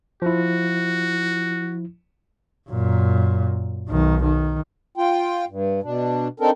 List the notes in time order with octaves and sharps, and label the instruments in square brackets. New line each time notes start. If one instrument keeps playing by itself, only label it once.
[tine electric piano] F3 E4 [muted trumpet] F#4
[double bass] F#2 A#2
B1 D#3
D#3
[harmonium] F4 G5
G2
B2 D4
C4 D4 D#4 A4 A#4